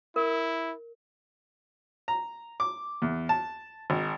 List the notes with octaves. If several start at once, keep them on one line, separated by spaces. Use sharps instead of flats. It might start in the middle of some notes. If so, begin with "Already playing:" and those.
E4 A#4
A#5
D6
E2
A5
G#1